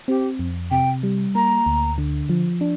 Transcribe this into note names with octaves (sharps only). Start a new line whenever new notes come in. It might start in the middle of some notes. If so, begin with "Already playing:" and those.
C4 G4
F2
C3 G5
G3
A#3 A#5
D2
D3
F3
D4